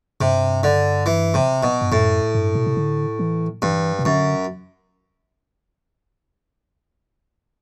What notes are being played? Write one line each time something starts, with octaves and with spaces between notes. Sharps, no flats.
G2 C3
D3
E3
C3
B2
G2
F#2 A2
G2
B2
C3
D3
E3
G2 E3
C3
F#2 D3